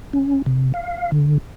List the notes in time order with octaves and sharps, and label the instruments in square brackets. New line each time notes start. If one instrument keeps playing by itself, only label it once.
[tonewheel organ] C#4
C3
F5
D3